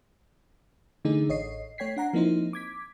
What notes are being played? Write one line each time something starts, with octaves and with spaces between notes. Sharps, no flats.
D3 E3 A3 D#4 G#4
A1 C#5 D#5 C7
A3 C#5 G5 G#6 B6 C7
D4 F#5 A#5 C7
F3 A#3 C4 D#4 E4 C5
D6 G#6 B6